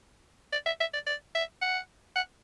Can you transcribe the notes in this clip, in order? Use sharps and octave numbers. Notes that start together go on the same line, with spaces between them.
D5
E5
E5
D5
D5
E5
F#5
F#5